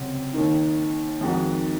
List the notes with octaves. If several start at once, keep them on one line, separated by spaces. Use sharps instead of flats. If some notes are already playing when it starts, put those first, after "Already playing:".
Already playing: C#2 C3 F#3 C4
D#2 D#3 A#3 D#4
F2 D#3 G#3 D#4 F#4